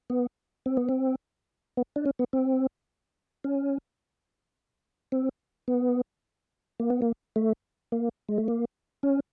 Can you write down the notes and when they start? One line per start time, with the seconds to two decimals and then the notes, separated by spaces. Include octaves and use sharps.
0.10 B3
0.66 C4
0.77 B3
0.89 C4
1.77 B3
1.96 D4
2.06 C#4
2.19 B3
2.33 C4
3.44 C#4
5.12 C4
5.68 B3
6.80 A#3
6.90 B3
7.02 A#3
7.36 A3
7.92 A#3
8.29 G#3
8.38 A3
8.48 A#3
9.03 C#4